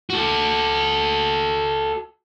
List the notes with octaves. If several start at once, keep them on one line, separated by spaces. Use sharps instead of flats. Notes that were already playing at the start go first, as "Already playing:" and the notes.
F#4 A4